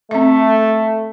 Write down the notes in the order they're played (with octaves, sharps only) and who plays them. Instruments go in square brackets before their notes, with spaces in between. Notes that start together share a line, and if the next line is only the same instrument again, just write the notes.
[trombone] A3 [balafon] C4 E5